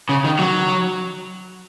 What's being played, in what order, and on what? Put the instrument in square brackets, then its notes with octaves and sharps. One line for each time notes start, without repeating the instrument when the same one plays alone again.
[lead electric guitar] C#3
D#3
F#3